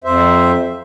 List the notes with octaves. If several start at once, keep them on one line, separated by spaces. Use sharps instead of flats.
F2 C5 E5